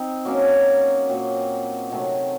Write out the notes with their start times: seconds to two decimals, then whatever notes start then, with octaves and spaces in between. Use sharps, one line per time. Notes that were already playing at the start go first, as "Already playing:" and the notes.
Already playing: C4 D#4
0.25 F#3 A#3 C#4
1.09 A#2 F#3 C4
1.91 C3 D#3 F#3 A3